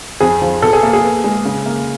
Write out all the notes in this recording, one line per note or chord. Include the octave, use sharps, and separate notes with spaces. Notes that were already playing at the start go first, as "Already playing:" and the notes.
F2 G#4
F3
B2 A4
G#4
A#3
G#4
B3
G#3
C#3
A#3